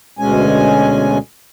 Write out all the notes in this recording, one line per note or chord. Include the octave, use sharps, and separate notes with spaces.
D2 B2 G#3 C#4 G#5